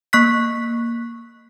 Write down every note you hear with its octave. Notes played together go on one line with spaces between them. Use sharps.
A#3 C#6 F#6 B6